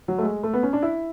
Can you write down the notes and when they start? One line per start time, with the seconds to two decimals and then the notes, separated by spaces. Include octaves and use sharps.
0.08 F#3
0.18 A3
0.23 G#3
0.43 A3
0.53 B3
0.63 C#4
0.73 D4
0.82 E4